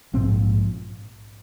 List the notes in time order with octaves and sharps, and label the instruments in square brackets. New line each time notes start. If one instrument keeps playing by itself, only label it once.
[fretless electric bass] A#1 G#2 C4